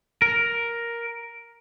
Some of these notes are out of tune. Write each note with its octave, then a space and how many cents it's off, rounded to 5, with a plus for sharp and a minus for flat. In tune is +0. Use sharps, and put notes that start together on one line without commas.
A#4 +5